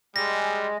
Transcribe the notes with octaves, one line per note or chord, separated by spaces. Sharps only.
G3 G#3 A#6